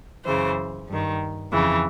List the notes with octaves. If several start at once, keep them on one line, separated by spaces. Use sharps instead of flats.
F#2 C#3 E3 C5
G2 D#3
F2 C#3 E3